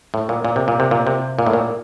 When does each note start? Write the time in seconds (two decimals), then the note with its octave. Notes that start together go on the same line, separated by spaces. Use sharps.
0.14 A2
0.29 A#2
0.45 A#2
0.56 C3
0.68 A#2
0.80 C3
0.91 A#2
1.07 C3
1.39 A#2
1.47 A2
1.53 A#2